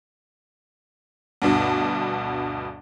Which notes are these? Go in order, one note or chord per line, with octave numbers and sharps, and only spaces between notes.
D2 G2 B2